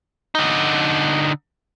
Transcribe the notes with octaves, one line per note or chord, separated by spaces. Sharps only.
D3 D#4